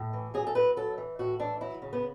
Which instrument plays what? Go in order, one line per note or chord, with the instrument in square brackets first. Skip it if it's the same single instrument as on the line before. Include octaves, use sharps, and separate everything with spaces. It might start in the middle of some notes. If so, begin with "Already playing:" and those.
Already playing: [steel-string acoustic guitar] A2
E3
F#3 G#4
A4
F#3 B4
F#3 A4
E3
A2 F#4
E3 D4
F#3 E4
C#3
B3